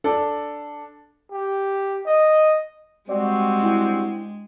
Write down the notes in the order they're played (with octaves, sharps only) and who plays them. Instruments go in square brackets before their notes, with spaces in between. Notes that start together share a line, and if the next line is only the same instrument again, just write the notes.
[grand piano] D4 A4
[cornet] G4
D#5
[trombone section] G3 C4 F#4 [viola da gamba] G#3 [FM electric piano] D5
[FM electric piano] D4 E4 G5